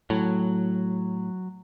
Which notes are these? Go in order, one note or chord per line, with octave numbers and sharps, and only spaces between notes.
A2 F#3